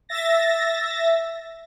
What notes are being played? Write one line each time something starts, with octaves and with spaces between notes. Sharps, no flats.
E5 A6 A#6